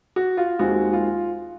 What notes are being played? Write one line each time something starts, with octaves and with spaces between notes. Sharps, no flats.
F#4
F4
D#2 D#3 G#3 C4 F#4
F4